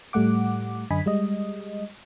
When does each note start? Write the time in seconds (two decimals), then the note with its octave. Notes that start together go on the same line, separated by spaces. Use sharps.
0.13 A2 G3 A3 F#5 D6
0.91 F#2 D3 D#5 G#5 B5 B6
1.06 G3 G#3 D#5